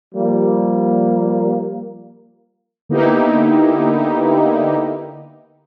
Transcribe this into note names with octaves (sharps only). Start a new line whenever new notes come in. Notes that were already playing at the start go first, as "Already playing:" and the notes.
F3 G3 A#3
D3 A#3 B3 D#4 E4 G4